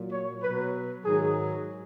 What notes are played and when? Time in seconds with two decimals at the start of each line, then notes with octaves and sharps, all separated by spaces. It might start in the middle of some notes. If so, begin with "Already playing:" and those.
Already playing: A#2 F#3
0.12 C#5
0.42 B2 F#3 B4
1.04 G#2 D#3 F#3 G#4